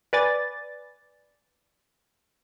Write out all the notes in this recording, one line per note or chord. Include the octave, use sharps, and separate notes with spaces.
B4 D5 G#5 A6